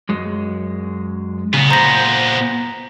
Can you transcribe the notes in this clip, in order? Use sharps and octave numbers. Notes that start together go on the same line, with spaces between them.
F#2 G#3
A#2 C#3 B3
C5 A#5 A#6